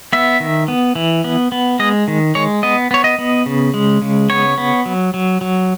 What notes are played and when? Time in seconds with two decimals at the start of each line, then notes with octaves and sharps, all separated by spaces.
0.13 B3 E5
0.40 D#3
0.68 B3
0.95 E3
1.24 B3
1.52 B3
1.79 G#3 D#5
2.08 D#3
2.35 G#3 C#5
2.63 B3 D#5
2.91 B3 C#5
3.04 D#5
3.19 B3
3.46 C#3
3.74 G#3
4.02 C#3
4.30 B3 C#5
4.58 B3
4.86 F#3
5.14 F#3
5.41 F#3